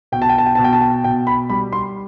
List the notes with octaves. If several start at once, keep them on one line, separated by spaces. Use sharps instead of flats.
B2 G5
A5
G5
A5
G5
B2 A5
G5
A5
G5
B2 G5
B5
G3 B5
C6